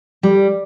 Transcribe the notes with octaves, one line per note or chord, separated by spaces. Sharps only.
G3